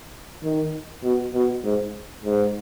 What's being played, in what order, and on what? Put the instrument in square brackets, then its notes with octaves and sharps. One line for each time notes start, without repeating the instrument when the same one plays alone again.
[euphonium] D#3
B2
B2
G#2
G#2